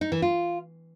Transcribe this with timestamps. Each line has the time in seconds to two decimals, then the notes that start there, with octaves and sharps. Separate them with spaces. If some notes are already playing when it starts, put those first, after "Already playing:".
0.01 D#4
0.12 E3
0.22 F4